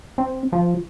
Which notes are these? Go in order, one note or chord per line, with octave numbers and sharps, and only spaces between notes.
C4
F3